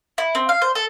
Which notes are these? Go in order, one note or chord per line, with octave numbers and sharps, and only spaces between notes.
E4
C4
F5
C5
A4